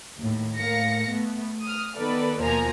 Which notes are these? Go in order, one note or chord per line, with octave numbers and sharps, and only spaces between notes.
D#2 A2
A2 A#4 F5 A#6 C#7
A3 B3
D#6 F6
D#3 B3 A4 B4 D5
D#2 B2 F3 A#3 G#5 A#5